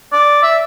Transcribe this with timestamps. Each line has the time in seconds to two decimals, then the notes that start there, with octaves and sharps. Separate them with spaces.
0.12 D5
0.43 E5